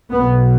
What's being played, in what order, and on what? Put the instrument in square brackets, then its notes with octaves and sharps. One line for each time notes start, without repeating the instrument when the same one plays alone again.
[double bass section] B1 B2 B3